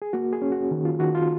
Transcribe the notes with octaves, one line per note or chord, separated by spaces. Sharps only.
G#4
A#3 F#4
G#4
C#4
F#4
D#3
F4
D#3 F#4
F4